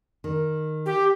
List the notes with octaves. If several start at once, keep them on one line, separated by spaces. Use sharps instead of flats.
D#3
G4